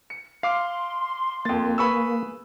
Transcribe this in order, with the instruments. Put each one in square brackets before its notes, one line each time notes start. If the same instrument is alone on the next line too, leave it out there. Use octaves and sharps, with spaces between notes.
[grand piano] C#7
[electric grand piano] F5 D6 F6 [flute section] C6 [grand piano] C7
[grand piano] F2 A6 [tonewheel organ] A#3
[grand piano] G#4 B4 [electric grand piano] B5 C#6 E6